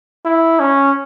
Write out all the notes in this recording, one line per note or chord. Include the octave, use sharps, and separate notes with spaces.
E4
C#4